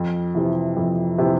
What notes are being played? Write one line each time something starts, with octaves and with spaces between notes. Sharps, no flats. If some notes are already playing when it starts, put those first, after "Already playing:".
Already playing: F2
C3 E3
F2
C3 E3